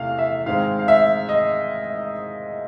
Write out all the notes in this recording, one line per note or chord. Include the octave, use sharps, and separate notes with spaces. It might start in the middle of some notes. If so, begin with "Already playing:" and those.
Already playing: E2 C3 A3 F5
E5
G#2 D#3 G#3 C4 F5
F5
E5
D#5